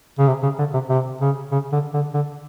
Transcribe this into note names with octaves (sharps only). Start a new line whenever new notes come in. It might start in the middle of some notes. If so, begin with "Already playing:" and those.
C#3
C3
C#3
D3
C3
C3
C#3
C#3
D3
D3
D3